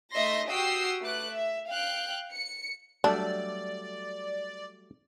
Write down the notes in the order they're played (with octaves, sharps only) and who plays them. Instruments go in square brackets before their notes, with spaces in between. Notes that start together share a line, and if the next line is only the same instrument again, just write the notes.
[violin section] A3 D#4 D#5 E5 C6 A#6
F#4 G4 G5 D#6 E6 C7
A3 B4 D6 F#6
E5
F5 G5 F#6
C#7
[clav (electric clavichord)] F#3 G3 A3 [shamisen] D4 [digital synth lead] D5